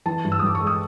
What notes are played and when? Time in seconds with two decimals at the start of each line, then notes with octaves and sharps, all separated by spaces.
0.06 E3 A5
0.24 G2
0.32 E6
0.39 D#6
0.43 G2 D6
0.55 C#6
0.61 G#3
0.67 D#6